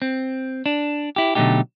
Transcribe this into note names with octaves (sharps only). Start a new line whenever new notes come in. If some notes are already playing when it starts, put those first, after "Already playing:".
C4
D4
E4 G4
B2 D3 F#3 A3 D#4 G4